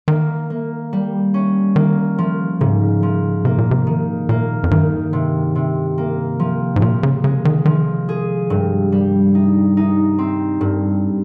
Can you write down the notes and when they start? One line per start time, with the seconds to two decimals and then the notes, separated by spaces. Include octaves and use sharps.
0.08 D#3 A#3
0.50 A#3
0.93 G3
1.34 C#4
1.76 D#3 A#3
2.18 F3
2.61 G#2 C#3
3.03 F3
3.45 C3 A#3
3.58 A#2
3.71 C3
3.87 D#3
4.29 A#2 A#3
4.64 F2
4.71 G2 D#3
5.13 C3
5.55 C3
5.98 A#3
6.40 F3
6.76 G#2
6.82 A#2 F3
7.03 C#3
7.24 C#3 G#3
7.45 D#3
7.65 D#3 F3
8.09 G#4
8.50 G2
8.92 G3
9.35 D#4
9.77 D#4
10.19 C4
10.61 G2